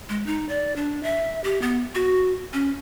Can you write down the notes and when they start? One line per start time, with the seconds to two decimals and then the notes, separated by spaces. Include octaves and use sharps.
0.09 G#3
0.26 D#4
0.49 D5
0.76 D4
1.03 E5
1.44 G4
1.62 B3
1.95 F#4
2.53 C#4